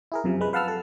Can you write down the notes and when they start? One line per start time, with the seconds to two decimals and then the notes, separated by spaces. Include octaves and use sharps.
0.12 E4 G#4 A#4
0.24 F#2 C3 F3
0.41 G#3 B4
0.53 B4 F5 F#5 A5 E6 F6
0.68 A4